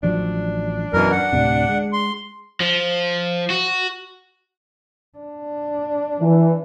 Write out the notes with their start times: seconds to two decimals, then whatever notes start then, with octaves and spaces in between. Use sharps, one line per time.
0.03 A1 F3 F#3 D4
0.93 F#2 B2 E3 A#4
1.12 F#5
1.33 D2 A2 C3
1.69 G#3
1.93 C6
2.60 F3
3.50 F#4
5.18 D4
6.20 E3